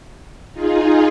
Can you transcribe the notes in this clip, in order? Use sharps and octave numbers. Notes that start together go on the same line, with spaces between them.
D#4 F4 G#4